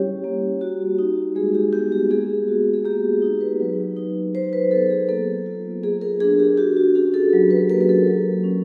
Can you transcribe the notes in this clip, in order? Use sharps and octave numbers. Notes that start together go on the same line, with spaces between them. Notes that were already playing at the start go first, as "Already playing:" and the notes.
Already playing: G3 C#4 E4 G4 C#5
A#3
F#4
D#4
G#3 G#4
G4
B3 G4
G4
A#3 G#4
F#4
G#4
A#3 G4
D#4
B4
F#3
D#4
F#3 C5
B4
B3 A4
G#4
A#3 A4
F4
A#3 G#4
A#4
D4 G#4
G4
F#4 G4
F#4
C#4 G#4
A4
F#3
B4
A#3 A#4
A#4
A4
F#3
C#4